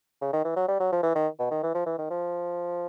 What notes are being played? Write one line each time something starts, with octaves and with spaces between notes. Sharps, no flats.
C#3
D#3
E3
F#3
G3
F#3
F3
E3
D#3
B2
D#3
E3
F3
E3
D#3
F3